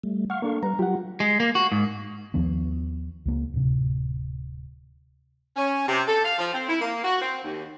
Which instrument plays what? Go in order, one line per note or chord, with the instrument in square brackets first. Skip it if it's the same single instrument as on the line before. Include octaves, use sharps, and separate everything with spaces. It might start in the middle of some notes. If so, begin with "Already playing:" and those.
[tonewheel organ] G3 A3
[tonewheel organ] F5 C#6 [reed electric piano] F#5 F6
[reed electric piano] A#3 D4 A4
[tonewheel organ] G3 B4 [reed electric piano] A#5
[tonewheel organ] F#3 F4 [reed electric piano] G4 F#5
[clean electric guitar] G#3
A#3
F#4
G#2
[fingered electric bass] D#2 D#3 F3 B3
C#2 A#3
D1 C3
[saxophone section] C#4
C3
A4
F5
F3
C4
E4
A#3
F#4
C4
D#2